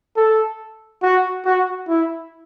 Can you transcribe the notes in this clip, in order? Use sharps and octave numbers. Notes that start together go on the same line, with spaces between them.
A4
F#4
F#4
E4